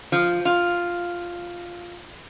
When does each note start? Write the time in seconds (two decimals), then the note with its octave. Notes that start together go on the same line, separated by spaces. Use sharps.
0.12 F3
0.45 F4